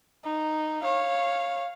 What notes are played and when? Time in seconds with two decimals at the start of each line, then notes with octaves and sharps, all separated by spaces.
0.24 D#4
0.82 C#5 F5